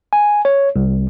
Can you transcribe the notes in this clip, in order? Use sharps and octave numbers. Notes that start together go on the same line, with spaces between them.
G#5
C#5
C2